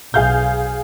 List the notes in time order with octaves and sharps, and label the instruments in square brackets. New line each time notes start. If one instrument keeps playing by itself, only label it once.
[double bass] B1 [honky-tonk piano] G#4 F5 G6